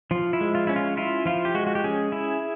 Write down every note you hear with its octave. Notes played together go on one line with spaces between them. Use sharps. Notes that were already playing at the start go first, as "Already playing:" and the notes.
F3 F4
E4
G#3
F4
C#4 E4
F4
E4 F4
F3 F4
G4
G#3 F#4
F#4
G4
C#4 G#4
E4